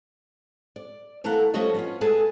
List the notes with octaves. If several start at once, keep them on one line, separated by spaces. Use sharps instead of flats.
D5
E3 A3 A4 A#4 F5 F#5
F3 G3 A3 C#4 F#4 D#5
B3 C#4 F4
G#3 A3 B3 G#4 A4 G#5